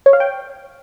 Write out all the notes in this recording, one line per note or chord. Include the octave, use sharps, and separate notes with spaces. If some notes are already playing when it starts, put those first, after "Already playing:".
C#5
F5
G5